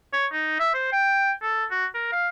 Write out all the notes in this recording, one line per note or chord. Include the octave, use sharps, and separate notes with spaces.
C#5
D#4
E5
C5
G5
A4
F#4
A#4
F5